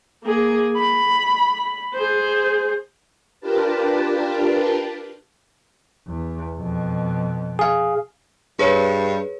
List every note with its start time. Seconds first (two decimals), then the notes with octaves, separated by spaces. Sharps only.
0.24 A#3 G#4
0.76 B5
1.94 G#4 C5
3.41 D4 F4 G4 A#4 B4 A5
6.08 E2
6.57 F2 B2
7.59 G#4 F5
8.59 G2 G#4 B4 C#5